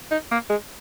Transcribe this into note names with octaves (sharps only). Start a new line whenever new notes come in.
D#4
A#3
G#3